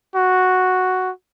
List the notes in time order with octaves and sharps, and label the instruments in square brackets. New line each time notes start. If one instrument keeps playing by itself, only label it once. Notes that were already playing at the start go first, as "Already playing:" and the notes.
[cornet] F#4